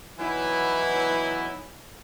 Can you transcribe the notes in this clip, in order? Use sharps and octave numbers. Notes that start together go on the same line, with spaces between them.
E3 F#3 B3 D#4 E4